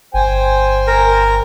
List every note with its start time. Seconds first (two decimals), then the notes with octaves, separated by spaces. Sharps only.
0.14 G1 C5 G5 G#5
0.87 A#4